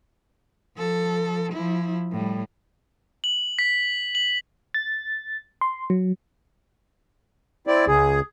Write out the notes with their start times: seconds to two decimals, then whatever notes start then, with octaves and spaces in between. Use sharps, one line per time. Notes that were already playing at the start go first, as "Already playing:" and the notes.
0.75 F3 A4
1.52 F3 E4
2.12 A2 G3
3.24 F#7
3.59 B6
4.15 F#7
4.74 A6
5.61 C6
5.90 F#3
7.67 C4 E4 D5
7.87 C#2 G#4